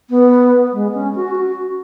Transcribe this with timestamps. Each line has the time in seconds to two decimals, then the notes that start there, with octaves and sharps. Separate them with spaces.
0.10 B3
0.73 G#3
0.94 C#4
1.15 F#4
1.36 F#4